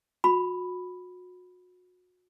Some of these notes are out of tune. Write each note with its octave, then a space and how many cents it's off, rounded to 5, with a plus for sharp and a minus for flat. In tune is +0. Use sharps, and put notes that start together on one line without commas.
F#4 -35 B5 +0